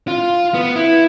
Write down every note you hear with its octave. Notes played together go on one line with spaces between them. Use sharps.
F4
B3
E4